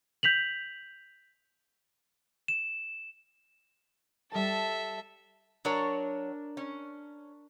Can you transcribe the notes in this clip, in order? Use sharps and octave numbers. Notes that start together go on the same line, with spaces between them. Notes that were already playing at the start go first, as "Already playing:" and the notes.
G6 B6 F7 F#7
E7
G3 A4 E5 A5
F#3 D4 A#4 C#5
C#4